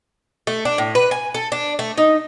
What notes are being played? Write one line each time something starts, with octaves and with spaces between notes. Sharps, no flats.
A3
D4
A2
B4
G#5
A4
D4
A3
D#4